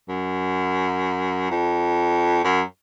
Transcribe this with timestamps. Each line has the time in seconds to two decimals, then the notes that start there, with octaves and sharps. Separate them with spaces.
0.09 F#2
1.50 F2
2.44 F#2